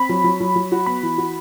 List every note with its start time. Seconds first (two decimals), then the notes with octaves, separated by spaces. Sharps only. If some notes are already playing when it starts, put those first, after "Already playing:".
Already playing: C4 B5
0.09 F#3
0.24 F#3
0.40 F#3
0.56 F#3
0.72 F#4
0.86 B3 B5
1.03 E3
1.18 F#4